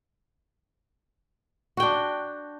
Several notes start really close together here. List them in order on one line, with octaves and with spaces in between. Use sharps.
F#4 G5 D4